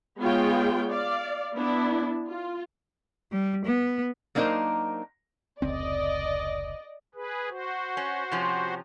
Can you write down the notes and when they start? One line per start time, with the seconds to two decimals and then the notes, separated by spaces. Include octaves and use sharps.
0.20 G#3 B3 F4 G#4 C#5 G5
0.89 D5 F5
1.55 B3 D4 E4
2.29 F4
3.32 G3
3.65 B3
4.35 F#3 A#3 D4 D#4 A#4 C5
5.62 F1 C#2 C4 D5 D#5
7.14 G#4 B4
7.50 F#4 C5
7.97 C#4
8.32 C3 F3 C#4